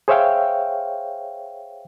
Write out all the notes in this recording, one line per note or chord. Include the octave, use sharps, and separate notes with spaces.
G#4 C5 C#5 E5 F5 G5